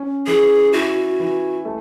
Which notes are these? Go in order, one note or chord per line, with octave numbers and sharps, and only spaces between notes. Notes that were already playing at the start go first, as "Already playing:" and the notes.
Already playing: C#4
E3 G#4
E4 F#4
E3
A3